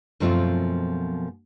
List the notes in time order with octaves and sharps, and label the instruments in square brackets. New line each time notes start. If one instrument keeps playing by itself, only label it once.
[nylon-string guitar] F#2 B2 F3 A3 C4 F4